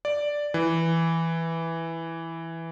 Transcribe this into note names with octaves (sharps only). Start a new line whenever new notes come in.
D5
E3